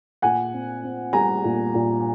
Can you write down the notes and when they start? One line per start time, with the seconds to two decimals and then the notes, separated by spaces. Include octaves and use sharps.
0.22 A#2 F#5 G#5
0.53 C4
0.83 C4
1.13 G3 G#5 A#5
1.44 A#2
1.74 A#2